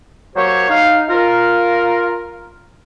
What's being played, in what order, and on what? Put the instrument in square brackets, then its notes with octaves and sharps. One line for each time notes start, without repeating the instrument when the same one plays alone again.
[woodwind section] F#3 A#3 G4 C5 C#5
D#4 F5
F4 A#4